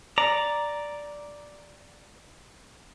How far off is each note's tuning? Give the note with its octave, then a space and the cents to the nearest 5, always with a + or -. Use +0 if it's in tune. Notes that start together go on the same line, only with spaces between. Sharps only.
D5 +0 A#5 +0